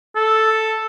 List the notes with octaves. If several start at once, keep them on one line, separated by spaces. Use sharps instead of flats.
A4